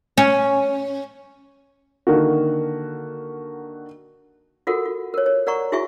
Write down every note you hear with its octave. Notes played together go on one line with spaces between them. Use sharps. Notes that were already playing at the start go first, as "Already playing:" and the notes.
C#4
D3 D#3 A#3 F#4
F4 F#4 A4 A#4 F#5
F4
A#4 C#5
C#5
A#4 D5 F#5 A#5 C#6
E4 F#4 G#4 E5 G#5 C#6